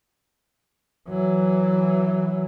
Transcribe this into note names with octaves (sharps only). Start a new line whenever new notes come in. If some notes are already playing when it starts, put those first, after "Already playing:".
E3 F#3